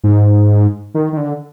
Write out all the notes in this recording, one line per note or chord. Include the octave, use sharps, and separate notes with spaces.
G#2
D#3
D#3
D3